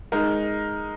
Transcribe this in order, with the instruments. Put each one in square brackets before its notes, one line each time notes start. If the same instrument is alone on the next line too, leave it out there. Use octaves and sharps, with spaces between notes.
[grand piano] G#3 D#4 A#4